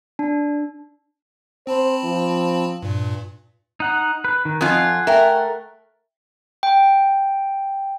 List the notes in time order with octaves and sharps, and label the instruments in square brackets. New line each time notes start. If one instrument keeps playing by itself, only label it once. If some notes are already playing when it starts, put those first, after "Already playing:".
[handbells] D4
[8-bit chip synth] C4 A5 B5 [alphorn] C5
[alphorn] F3
[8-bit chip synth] G2 A#2
[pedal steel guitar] D#4 F#5
B4
D#3
[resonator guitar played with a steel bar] F2 F4 [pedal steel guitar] F#5 G#5
[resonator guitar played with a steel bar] A3 A#4 [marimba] E5 G5
[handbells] G5